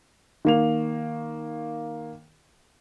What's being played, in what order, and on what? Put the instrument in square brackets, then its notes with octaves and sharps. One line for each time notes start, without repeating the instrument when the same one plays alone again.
[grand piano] D#3 A#3 F7